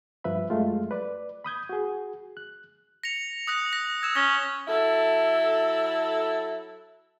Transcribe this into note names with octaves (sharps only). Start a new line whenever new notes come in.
G2 F3 B4 E5 B5
F#2 F#3 G#3 A3 F4
B4 D5
B5 D#6 G6 G#6
F#4 G#4
F#6
A#6 C#7 F7
D#6 F#6 A#6
A#6
E6 G#6 E7
C#4 A#6 G7
F#3 E4 A4